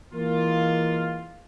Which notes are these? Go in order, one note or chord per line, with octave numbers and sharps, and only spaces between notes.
E3 G#3 A#3 F4